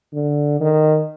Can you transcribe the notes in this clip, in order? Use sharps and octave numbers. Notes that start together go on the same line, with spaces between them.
D3
D#3